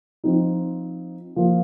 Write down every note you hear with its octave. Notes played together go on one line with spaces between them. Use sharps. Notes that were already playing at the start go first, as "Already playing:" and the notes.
F3 C4 D#4
F3 A#3 F4